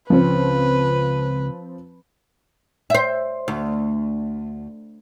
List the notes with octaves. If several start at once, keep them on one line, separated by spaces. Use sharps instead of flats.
C#2 C#3 F3 C4 C#4 B4
C5 E5
D2